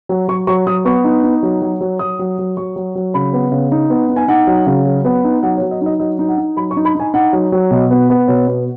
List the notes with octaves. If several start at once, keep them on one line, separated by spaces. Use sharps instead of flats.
F#3
F#3 C#6
F#3 C#6
F#3 D#6
B3 C#6
D#4
D#4
F#3
F#3
F#3
F#3 D#6
F#3
F#3
F#3 C#6
F#3
F#3
C#3 B5
B3
C#3
D#4
B3
D#4
G#5
D#4 F#5
F#3
C#3
F#3
B3
D#4
F#3 F#5
C#5
F#3
D#5
D#4 D#5
F#3 D#5
D#4
F#5
D#4
F#3 B5
C#6
D#4
B5
D#4 G#5
D#4 F#5
F#3
F#3
B2 D#5
B3
B3
B2 C#5
B3